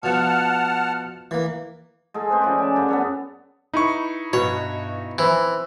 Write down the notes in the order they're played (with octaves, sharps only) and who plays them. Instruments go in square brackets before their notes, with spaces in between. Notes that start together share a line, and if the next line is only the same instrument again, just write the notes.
[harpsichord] B2 F3 [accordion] F#5 A5 F6
[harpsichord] E3 A#3
[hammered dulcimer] G#3 G#4 A4
C4 B4 C5
F3 C#4 D5
G#5 A5
F#2 D4
B3 A4 C#5
[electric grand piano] D#4 E4 C#6 [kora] B4
[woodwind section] G2 F#4 [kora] B2 [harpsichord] C#5
[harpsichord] E3 [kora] C4